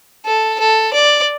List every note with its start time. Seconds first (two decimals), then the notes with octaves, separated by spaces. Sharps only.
0.26 A4
0.60 A4
0.94 D5